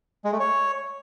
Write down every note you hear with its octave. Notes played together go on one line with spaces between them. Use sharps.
G#3
A3
C#5